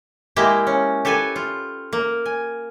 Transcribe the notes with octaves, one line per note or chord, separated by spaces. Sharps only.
G#3 A#3 E4 G4
C#4
G4 A4 B4 G#5
F4
A#3
G#5